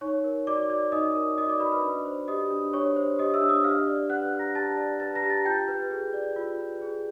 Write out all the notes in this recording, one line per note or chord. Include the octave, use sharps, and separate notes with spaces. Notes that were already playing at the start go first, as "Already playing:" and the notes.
D#4 C#5 C#6
A#4
F#4 D5 D6
D5
D#4 D#5 D#6
A#4
F#4 D#5 D#6
D5 D6
B4 D5 B5
B4 B5
D4
C5
G4 D#5 D#6
D4
D4 C#5 C#6
C5
G4 D#5 D#6
E5 E6
D4
D#5 D#6
G4 F5 F6
D5
B4 F#5 F#6
G4
A#5 A#6
G4 A5 A6
D5
B4 A5 A6
A#5 A#6
G4
A5 A6
F4 G5 G6
B4
G#4
D5
F4
B4
G#4